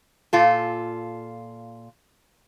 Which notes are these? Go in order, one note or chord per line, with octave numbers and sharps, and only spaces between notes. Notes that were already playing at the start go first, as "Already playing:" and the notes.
A#2 F4 A4